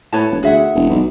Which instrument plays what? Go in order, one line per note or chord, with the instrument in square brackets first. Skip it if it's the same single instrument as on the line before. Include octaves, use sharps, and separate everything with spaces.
[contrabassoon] A2 [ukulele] B4 C#5 A5
[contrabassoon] E1
[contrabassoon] D2 [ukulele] G#4 E5 F#5
[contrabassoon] E1
B1